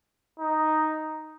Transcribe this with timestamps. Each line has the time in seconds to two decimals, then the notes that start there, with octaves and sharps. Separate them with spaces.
0.40 D#4